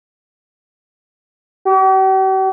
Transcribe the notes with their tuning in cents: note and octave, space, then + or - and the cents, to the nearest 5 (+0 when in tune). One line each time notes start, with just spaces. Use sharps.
G4 -45